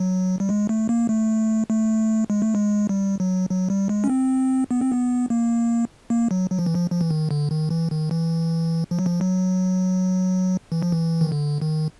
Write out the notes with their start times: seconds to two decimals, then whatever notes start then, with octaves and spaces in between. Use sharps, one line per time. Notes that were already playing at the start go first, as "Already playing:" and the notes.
Already playing: F#3
0.40 G3
0.49 G#3
0.69 A3
0.89 A#3
1.09 A3
1.70 A3
2.30 G#3
2.42 A3
2.55 G#3
2.89 G3
3.20 F#3
3.50 F#3
3.70 G3
3.89 G#3
4.04 C#4
4.09 C4
4.71 B3
4.81 C4
4.92 B3
5.30 A#3
6.10 A#3
6.31 F#3
6.51 F#3
6.59 F3
6.66 E3
6.75 F3
6.91 F3
7.01 E3
7.10 D#3
7.31 D3
7.51 D#3
7.70 E3
7.91 D#3
8.11 E3
8.91 F3
8.99 F#3
9.06 F3
9.21 F#3
10.72 E3
10.82 F3
10.92 E3
11.21 D#3
11.32 D3
11.62 D#3